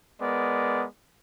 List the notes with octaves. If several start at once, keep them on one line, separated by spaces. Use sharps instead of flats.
G#3 B3 A#4 D5